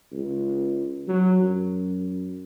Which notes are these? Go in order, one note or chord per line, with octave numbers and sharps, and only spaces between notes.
C#2
F#3
F#2